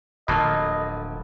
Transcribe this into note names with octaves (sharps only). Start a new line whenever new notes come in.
D1 D3 F3 F#3 A#3 D#5 A5 B5